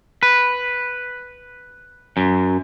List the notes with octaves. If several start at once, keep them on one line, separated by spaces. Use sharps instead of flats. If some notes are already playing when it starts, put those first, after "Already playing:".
B4
F#2